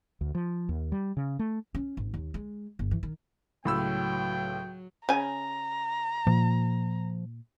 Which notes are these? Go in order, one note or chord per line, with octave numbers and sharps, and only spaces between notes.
D2
F3
D#2
G3
C#3
A3
C#4
G#1
D#2
G#3
G1
E3
D#3
C#2 A2 F#3 G5 B5 E6
C#3 G#5 A#5
A#2 F3